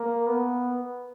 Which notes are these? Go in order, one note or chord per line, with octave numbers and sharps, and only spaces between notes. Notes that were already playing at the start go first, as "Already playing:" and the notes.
Already playing: A#3
B3